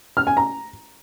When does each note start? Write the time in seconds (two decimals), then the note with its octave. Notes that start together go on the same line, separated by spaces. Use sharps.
0.17 F6
0.27 G#5
0.37 A#5